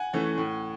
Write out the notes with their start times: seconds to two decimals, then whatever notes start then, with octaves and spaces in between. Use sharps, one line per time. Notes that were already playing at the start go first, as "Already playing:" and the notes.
Already playing: F#5 G#5
0.13 E3 A3 C#4
0.37 A2